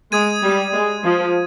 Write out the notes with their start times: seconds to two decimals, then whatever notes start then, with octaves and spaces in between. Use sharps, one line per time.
0.12 G#3 D#6 G#6 D#7
0.43 G3
0.73 G#3
1.04 F3